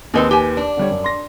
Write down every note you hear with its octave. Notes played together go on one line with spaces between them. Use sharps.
D#2 C4 D#4 G#4 B4
G4 G#5
D4
D3 G3 C#5
F#2
C6 A#6